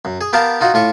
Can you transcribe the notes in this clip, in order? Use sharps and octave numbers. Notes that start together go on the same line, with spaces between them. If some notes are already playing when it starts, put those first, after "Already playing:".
F#2
G#4
B3 G4 A#4 F5 A5 A#5
D#4 F4 F#4
A2 F4 C#6